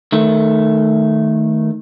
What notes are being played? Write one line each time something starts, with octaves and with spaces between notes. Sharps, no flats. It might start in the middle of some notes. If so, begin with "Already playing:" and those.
D#3 A3